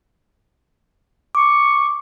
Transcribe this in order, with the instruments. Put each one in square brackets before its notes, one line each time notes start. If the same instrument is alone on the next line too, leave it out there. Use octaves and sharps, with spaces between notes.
[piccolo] C#6 [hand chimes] D6